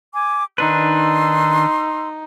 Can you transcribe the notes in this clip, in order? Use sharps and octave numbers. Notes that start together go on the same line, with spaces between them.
G#5 D6
D#3 D4 D#4 B4 C6 E6